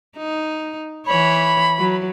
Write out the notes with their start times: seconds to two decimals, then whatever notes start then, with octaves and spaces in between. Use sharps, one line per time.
0.17 D#4
1.07 E3 C#5 B5
1.79 F#3